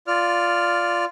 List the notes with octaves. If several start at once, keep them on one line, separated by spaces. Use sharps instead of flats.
F4 D5 F6